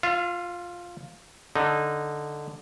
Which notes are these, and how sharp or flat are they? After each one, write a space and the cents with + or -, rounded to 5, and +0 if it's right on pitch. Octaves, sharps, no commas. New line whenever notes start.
F4 +10 F5 -40
D3 +0 D#4 -10